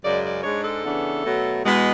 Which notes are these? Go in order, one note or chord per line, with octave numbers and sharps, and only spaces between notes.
F#2 C#3 G#3 D5
D5
G#2 G#3 D4 C#5
A4
C#3 E3 B3 D4
B2 F#3 A3
E2 B2 G#3 B3